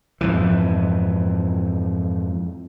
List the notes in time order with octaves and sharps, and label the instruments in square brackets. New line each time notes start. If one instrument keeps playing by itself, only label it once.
[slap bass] F2 G#2 E3